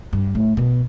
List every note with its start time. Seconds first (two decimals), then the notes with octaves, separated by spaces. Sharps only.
0.13 G2
0.35 A2
0.57 B2